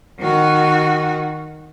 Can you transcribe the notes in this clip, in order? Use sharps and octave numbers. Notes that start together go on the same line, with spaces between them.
D#3 F#4